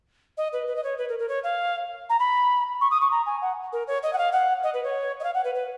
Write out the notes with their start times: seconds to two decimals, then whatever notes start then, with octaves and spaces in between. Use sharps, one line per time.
0.37 D#5
0.53 B4
0.67 B4
0.76 D#5
0.83 C#5
0.98 B4
1.09 A#4
1.19 A#4
1.28 C#5
1.43 F5
2.09 A#5
2.19 B5
2.81 C#6
2.91 D#6
3.01 C#6
3.11 A#5
3.26 G#5
3.41 F#5
3.72 A#4
3.87 C#5
4.03 D#5
4.13 F#5
4.18 F5
4.32 F#5
4.63 D#5
4.74 B4
4.84 C#5
5.20 D#5
5.24 F5
5.34 F#5
5.44 B4
5.55 B4